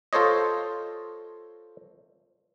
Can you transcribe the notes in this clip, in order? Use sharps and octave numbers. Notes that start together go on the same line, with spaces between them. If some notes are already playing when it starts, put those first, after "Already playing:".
F4 A4 C5 C#5 D#5